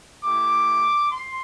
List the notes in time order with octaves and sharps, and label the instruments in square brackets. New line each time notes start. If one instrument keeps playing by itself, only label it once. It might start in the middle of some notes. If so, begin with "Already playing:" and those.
[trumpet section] A3 E4 G4 D6
C6